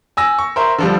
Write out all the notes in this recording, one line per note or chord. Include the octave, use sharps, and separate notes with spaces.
G#5 E6 A#6
C#6
A#4 C5 E5
D3 F3 G3